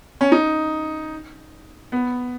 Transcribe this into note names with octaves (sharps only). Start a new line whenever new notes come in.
C#4
D#4
B3